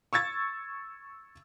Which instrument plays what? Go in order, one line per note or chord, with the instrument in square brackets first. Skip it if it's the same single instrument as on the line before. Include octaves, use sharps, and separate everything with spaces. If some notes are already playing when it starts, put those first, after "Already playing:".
[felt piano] C#6 E6 G#6 A6